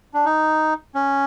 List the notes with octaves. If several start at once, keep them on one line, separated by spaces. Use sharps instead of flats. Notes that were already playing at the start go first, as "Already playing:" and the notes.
D4
D#4
C#4